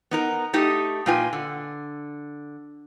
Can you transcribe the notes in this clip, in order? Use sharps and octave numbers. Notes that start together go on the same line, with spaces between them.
B3 D#4 A#4
A3 D#4 G4 D#5
A#2 D#4 F4 B4 G5 G#5
D3